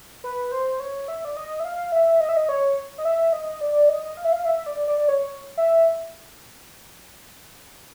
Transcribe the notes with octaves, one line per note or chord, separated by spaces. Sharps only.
B4
C5
C#5
E5
D5
D#5
E5
F5
E5
D#5
E5
D#5
C#5
D#5
E5
D#5
D5
D#5
F5
E5
F5
E5
D5
D5
D5
C#5
E5